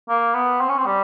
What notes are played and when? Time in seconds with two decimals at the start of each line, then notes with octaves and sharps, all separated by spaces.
0.09 A#3
0.34 B3
0.60 C4
0.69 C#4
0.77 C4
0.86 G3